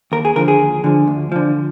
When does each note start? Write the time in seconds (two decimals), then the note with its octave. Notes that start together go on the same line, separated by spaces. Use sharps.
0.12 D#2 A#4
0.25 G#4
0.36 D3 F3 A#4
0.48 G#4
0.60 D#2
0.84 D3 F3
1.08 D2
1.32 D3 F3